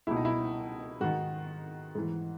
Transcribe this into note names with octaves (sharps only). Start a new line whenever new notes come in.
C#2 B2 E4
D#4
E4
G#2 D#3 F#4
G#2 E3